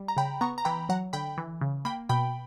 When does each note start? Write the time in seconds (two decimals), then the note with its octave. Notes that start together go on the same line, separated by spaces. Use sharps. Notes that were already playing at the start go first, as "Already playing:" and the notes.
Already playing: G3
0.08 A#5
0.17 C#3 G5 B5
0.41 B3 A#5 C#6
0.58 A#5
0.65 E3 G5 B5
0.89 F#3 F#5 A#5
1.13 D3 G5 B5
1.38 E3
1.61 C#3
1.85 A#3 G5 B5
2.09 B2 G5 B5